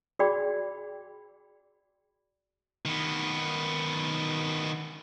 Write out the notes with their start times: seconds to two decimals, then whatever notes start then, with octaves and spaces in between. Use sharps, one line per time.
0.19 F#4 G#4 D5 G5 B5
2.85 D#3 B3